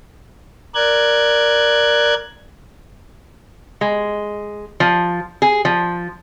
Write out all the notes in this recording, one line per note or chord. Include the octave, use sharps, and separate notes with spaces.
A#4 D5 F#6 G#6
G#3
F3
G#4
F3